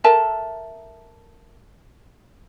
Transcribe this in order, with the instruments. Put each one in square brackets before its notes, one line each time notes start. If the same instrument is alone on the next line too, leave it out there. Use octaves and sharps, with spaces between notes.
[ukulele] A4 A#4 E5 A5